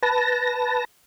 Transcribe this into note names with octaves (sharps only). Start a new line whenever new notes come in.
B4 A5 A#6